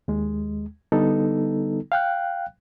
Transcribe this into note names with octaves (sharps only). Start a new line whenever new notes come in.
D#2 G#3
D3 G3 B3 D#4 A4
F5 G5 F#6